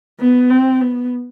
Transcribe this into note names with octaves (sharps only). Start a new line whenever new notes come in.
B3
C4
B3